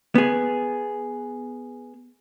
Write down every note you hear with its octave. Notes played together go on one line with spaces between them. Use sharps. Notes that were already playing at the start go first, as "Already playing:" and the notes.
B3 G#4